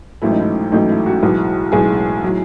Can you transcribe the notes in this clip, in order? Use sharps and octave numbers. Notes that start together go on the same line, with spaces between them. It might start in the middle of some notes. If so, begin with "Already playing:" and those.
A1 G#2 F#3 A3 E4
D#4
E4
A1 G#2 F#3 A3 D#4
E4
F#4
B1 A2 E3 G#3
B1 A2 E3 G#3 G#4
A2 F#3